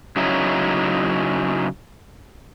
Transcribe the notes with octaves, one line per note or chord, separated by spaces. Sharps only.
C#3 F#3 C#4 D#4 E4